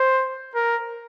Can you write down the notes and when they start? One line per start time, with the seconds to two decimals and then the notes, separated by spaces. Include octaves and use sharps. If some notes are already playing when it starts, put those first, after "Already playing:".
Already playing: C5
0.55 A#4